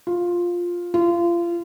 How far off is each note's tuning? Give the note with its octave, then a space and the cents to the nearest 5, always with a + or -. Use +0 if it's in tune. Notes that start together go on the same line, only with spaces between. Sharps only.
F4 +5
F4 -30